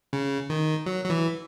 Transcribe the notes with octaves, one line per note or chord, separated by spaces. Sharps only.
C#3
D#3
F#3
F#3
E3